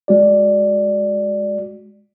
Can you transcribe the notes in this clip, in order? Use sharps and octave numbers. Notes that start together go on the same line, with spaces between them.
G#3 F#4 D5